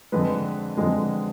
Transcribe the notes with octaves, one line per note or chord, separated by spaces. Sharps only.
F2 D3 G#3 B4
F2 D3 G#3